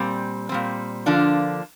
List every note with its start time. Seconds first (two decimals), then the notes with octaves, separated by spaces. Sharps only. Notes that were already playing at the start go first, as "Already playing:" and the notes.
Already playing: A#2 G3 C4
0.49 A#2 G3 C4
1.06 D3 F3 A#3 D4 F4